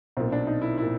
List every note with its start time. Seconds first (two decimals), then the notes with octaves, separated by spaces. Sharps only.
0.17 B1 A#2 C4
0.32 D4
0.47 D#4
0.62 E4
0.78 A#2 E4